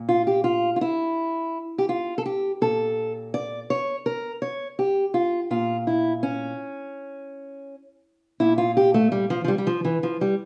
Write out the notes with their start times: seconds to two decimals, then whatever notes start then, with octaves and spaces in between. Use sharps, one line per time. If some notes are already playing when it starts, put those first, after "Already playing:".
Already playing: A#2
0.09 F4
0.27 G4
0.44 F4
0.76 F4
0.81 E4
1.78 G4
1.89 F4
2.18 A4
2.26 G4
2.61 A#2 A4
3.34 D5
3.70 C#5
4.06 A#4
4.42 C#5
4.79 G4
5.14 F4
5.50 A#2 F4
5.87 E4
6.23 C#4
8.40 A#2 E4
8.58 F4
8.77 G4
8.94 A3
9.12 G3
9.30 F3
9.44 F3
9.48 G3
9.58 G3
9.67 F3
9.85 E3
10.03 F3
10.21 G3